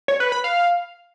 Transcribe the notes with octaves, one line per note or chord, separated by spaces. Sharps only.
C#5
B4
B5
F5